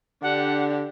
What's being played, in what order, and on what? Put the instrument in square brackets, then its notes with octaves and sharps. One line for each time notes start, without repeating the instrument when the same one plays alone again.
[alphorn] D3 [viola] D4 G4 [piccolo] F#5